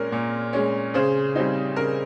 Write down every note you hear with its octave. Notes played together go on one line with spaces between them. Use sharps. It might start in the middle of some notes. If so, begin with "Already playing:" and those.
Already playing: A#2 G#3 C#4 A#4
A#2
G#3 C#4
C#3 G#4 C5
G3 C4 D#4
C#3 A#4